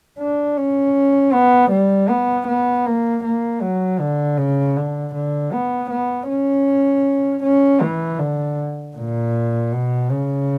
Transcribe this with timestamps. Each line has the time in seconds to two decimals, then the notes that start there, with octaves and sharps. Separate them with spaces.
0.19 D4
0.57 C#4
1.33 B3
1.71 G3
2.09 B3
2.47 B3
2.86 A#3
3.24 A#3
3.62 F#3
4.00 D3
4.38 C#3
4.76 D3
5.14 D3
5.52 B3
5.91 B3
6.29 C#4
7.43 C#4
7.81 E3
8.19 D3
8.96 A#2
9.72 B2
10.10 C#3